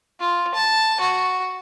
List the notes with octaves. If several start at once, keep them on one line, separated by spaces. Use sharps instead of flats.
F4
A5
F#4